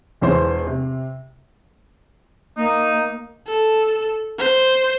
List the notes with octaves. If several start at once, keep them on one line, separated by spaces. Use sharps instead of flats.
E1 E2 E3 C5 C6
C3
A#3 D#4
A4
C5